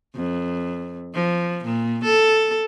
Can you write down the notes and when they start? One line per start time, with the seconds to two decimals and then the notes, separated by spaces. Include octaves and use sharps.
0.16 F2
1.14 F3
1.65 A#2
2.04 A4